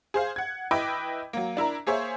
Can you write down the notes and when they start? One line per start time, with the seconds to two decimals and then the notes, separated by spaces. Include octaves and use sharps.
0.14 G#4 C5 F5
0.36 F#5 G#6
0.71 E4 B4 D#5 G5 B5 D6
1.33 F#3 A#3
1.57 D4 E4 A#4 A#5
1.87 A#3 G#4 C5 C#5 E5